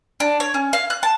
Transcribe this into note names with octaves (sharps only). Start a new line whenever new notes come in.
D4
C#5
C#4
F5
F#6
A5